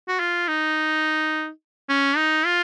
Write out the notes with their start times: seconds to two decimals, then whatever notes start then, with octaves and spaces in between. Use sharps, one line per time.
0.08 F#4
0.20 F4
0.48 D#4
1.89 C#4
2.17 D#4
2.45 F4